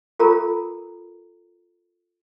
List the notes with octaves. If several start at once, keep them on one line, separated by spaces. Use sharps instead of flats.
F4 A4 A#4 A#5